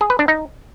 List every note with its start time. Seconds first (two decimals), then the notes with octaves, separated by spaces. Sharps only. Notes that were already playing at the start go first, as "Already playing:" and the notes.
0.01 G#4
0.10 B4
0.19 D4
0.28 D#4